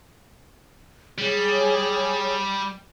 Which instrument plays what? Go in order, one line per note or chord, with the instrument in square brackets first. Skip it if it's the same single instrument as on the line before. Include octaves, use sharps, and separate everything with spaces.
[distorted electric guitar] G3 [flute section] G#4 C#5